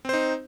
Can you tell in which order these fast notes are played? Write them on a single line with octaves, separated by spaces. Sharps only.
C4 C5 D#4